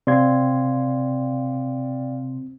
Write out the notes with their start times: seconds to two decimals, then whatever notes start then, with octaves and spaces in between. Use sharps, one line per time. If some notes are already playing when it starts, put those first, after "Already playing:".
0.07 C3 C4 D5 F5 G5 C6 G#6